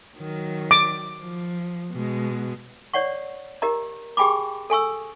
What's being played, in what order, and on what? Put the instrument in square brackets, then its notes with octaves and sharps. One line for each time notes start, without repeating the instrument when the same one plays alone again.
[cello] D#3 F#3
[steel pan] D6
[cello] F3
B2 G#3
[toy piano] C#5 D5 F#5 C#6
G4 A#4 D#5 A#5
G4 G#4 G5 G#5 B5 D6
A4 G#5 C#6 E6